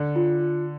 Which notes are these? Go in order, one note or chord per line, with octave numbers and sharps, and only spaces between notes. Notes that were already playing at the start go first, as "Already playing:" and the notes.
Already playing: D3
F4
F4